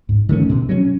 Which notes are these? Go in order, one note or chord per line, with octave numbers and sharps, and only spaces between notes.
G#2
D#3 A3 C#4
B2
F#3 C#4